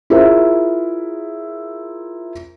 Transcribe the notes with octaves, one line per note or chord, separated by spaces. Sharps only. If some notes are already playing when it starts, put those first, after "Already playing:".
E4 F4 G#4 A#4 C5 E5